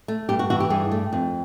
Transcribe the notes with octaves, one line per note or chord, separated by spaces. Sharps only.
A3
G2 G4
F#4
E3 F#4
G4
G2 G#4
A3
F2